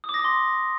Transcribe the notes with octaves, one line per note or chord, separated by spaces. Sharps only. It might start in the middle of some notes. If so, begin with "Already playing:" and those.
D#6
D6
A#6
D6
C6